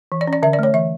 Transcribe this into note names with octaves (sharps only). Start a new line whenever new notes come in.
E3
D5
C#4
D5
D3 E5
D5
A3 C#5
E3 E5